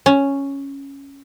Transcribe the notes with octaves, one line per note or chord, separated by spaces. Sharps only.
C#4